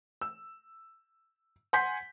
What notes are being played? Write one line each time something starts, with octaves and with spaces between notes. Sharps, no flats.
E6
F#5 G#5 C6 G6 B6